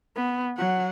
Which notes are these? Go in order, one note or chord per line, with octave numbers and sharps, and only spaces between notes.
B3
F#3 F#5